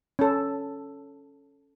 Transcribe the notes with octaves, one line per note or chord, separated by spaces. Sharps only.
C#4 A4